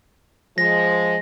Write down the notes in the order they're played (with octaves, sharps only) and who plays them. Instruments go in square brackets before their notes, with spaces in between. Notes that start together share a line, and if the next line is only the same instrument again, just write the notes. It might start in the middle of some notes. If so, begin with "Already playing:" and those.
[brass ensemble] F3 G#3 [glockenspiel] A#6